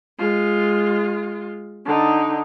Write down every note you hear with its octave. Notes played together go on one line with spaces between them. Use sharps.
G#3 F4
D3 D#4